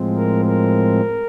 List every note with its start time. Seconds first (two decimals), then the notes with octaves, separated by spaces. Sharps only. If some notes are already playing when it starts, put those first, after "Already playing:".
Already playing: A2 F3 G#3 C4
0.16 A#4
0.45 A#4